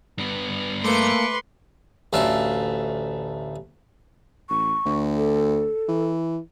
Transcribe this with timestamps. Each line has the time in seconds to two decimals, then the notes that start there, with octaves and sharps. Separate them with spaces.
0.18 G2 B3
0.84 A3 A#3 B4 C6 D6 C#7
2.13 A1 D2 E5 F5 A5
4.49 A1 C#6
4.85 D2
5.17 A4
5.88 E3